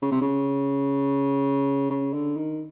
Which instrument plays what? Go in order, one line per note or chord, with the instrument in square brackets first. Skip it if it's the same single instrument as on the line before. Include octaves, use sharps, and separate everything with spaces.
[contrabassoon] C#3
C3
C#3
C#3
D3
D#3